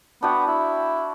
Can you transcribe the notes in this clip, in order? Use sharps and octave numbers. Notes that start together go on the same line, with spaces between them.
B3 D4 F#4 G5
E4